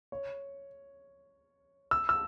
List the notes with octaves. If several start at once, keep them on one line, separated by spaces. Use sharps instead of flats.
C#5
E6
E6